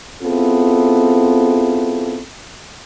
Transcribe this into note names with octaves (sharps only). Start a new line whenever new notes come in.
B3 C4 E4 F4 G#4 A4